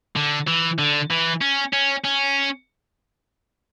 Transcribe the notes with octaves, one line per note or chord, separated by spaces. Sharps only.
D3
E3
D3
E3
C#4
C#4
C#4